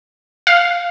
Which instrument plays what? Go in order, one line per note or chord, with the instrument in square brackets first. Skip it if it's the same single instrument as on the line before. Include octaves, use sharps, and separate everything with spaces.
[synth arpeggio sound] F5